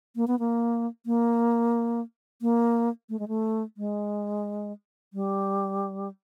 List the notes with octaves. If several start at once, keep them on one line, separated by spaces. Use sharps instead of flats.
A#3
B3
A#3
A#3
A#3
A3
G#3
A3
G#3
G3